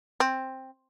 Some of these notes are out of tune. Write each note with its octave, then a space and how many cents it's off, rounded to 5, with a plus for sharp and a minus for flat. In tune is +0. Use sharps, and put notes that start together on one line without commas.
C4 +10